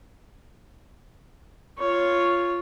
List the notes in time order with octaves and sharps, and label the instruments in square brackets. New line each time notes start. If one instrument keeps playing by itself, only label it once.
[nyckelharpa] F4 C#5